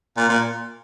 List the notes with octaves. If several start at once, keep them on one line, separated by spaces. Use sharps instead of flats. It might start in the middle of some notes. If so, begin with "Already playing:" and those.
A#2
A#2